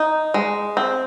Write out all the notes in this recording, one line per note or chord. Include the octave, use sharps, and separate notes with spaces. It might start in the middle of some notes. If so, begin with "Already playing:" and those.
Already playing: D#4
G#3
C4